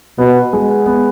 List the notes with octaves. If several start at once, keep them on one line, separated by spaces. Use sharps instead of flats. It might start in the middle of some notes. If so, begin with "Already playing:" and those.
B2 B3
G#3
B3